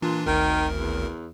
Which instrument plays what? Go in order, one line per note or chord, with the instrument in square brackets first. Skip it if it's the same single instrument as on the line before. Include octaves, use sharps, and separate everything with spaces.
[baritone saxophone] A#2 [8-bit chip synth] E3 D4 F4
[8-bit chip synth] G#1 D2 A#4 [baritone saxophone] D#3
[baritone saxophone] E2